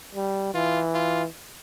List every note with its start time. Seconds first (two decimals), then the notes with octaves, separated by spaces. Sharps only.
0.15 G3
0.54 E3 F4
0.95 F4